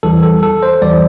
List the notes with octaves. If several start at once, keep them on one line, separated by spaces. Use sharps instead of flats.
E2 E3 G3 A4
A4
A4
C5
E2 E3 G3 D5